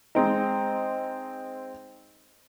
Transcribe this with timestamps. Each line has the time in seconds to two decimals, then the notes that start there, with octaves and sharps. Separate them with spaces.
0.15 G#3 C4 D#4